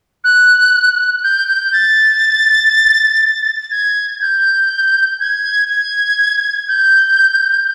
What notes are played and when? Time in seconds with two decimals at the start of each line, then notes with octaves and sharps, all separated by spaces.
0.24 F#6
1.24 G6
1.48 G6
1.73 A6
3.71 G#6
4.21 G6
5.20 G#6
5.69 G#6
6.68 G6